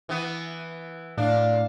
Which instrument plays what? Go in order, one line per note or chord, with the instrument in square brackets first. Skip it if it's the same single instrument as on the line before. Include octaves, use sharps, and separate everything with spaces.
[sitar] E3 B3
[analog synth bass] A2 [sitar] D4 [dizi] F5